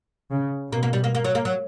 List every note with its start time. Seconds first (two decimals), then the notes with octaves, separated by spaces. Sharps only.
0.31 C#3
0.72 B2 A#3
0.83 A#3
0.93 G3
1.04 A#3
1.15 A#3
1.24 F#3
1.35 A#3
1.45 F#3